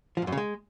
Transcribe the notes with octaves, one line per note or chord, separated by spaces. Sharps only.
F3
G#2
F#2
C#3
G#3